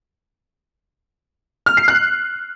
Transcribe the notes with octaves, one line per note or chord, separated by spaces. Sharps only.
F6
C7
F#6